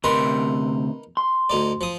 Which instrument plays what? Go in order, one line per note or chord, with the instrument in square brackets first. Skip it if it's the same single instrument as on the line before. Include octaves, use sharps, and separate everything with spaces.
[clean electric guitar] D2 C3 C6 [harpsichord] D#4 A#4 B4
[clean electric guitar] C6
[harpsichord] D2 D#4 D5
F3 D#6